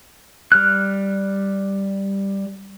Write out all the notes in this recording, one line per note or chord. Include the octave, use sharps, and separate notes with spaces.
G3 F6 F#6